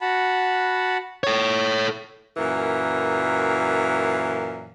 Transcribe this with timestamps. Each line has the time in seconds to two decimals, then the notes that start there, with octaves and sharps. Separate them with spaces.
0.01 F#4 F#5 A5 B5
1.24 A4 C#5
2.37 F#2 A#2 E3